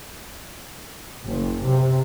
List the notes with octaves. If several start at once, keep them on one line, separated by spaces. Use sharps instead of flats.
F#1
C3